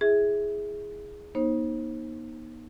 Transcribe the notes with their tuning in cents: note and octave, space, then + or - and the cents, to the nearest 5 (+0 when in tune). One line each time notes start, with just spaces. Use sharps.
E4 +30 G#4 +0 E5 -20
B3 -45 D#4 +0 C5 +30